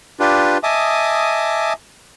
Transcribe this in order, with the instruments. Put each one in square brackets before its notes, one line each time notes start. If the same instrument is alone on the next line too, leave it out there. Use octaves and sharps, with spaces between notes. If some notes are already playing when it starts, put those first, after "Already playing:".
[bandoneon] D4 F4 G4 B4
D#5 E5 G#5 A5 D6 D#6